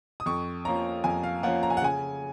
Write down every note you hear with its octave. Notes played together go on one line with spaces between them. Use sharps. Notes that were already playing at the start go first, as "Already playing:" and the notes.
D#6
F2 C#6
F3 A#3 C#4 A#5
F2 G#5
F5
F3 A#3 C#4 F#5
A#5
G#5
F#5
C#3 G#5